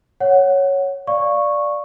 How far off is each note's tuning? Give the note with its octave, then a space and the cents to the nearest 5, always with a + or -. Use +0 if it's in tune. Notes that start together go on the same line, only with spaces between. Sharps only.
C#5 +0 F#5 +0
D5 +0 F5 +0 C#6 -5